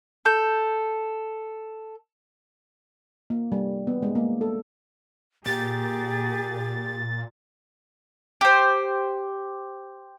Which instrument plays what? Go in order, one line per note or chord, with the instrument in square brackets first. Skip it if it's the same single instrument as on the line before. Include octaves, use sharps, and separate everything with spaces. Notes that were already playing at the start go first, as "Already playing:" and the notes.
[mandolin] A4 G6
[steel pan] A#3
G3
B3
G#3
A#3
A4
[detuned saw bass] A#2 [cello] A#3 G#4 [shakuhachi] G4 [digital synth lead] A6
[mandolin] G4 C5